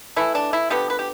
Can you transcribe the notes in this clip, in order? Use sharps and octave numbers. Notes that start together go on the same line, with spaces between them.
E3 A3 E4
D4
E4
D3 F3 B3 G4
B4
G4